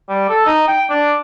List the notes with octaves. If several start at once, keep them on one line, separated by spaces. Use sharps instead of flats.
G3
A4
D#4
G5
D4